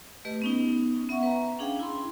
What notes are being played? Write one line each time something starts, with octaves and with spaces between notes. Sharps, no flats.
A3 G4 B4 D#5
B3 C#4 D#4
B3 E5 F#5 C#6
B4 A#5
C#4 D4 G#4 F5 G5
E4 B5 C6